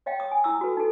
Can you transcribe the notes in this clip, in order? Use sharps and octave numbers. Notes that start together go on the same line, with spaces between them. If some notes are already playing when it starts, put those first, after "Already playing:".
C#5 D#5 F5 G5
D#6
G#5
E4 D#6 E6
F#4 A4 B4
D#4 A4